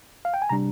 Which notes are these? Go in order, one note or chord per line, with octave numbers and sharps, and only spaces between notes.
F5
G5
G#5
C3 G3 D4 A#5